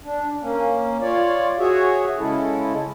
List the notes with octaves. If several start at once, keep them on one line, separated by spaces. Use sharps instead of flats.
D4
A#3 C#4
F4 C#5 D5
F#4 G#4 C#5 E5
C#3 G#3 C#4 E4 A4